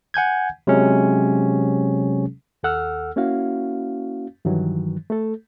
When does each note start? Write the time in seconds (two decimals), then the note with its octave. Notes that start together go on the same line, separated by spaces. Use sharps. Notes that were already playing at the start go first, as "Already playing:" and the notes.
0.14 F#5 G#5 G6 G#6
0.67 C3 F#3 G#3 C#4 G#4
2.63 D#2 A4 F#5 E6 F6
3.16 A#3 C#4 E4 F#4 F5
4.45 G2 D#3 E3 F#3
5.10 A3 A4